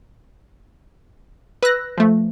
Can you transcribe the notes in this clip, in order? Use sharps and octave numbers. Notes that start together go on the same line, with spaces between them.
B4 E6 F#6 A#6
F3 A3